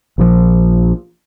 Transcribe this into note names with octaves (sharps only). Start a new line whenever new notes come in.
A#1 A#2 F3